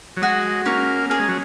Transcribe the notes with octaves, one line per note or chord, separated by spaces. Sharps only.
F#3
G#3 F#4
A#3 C#4
A#3 G#4
G#3
F#3